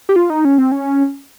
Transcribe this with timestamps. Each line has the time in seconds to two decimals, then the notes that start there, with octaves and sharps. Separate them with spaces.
0.09 G4
0.16 F4
0.30 D#4
0.45 C#4
0.58 C4
0.72 C#4